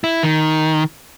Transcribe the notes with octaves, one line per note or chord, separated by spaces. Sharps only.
E4
D#3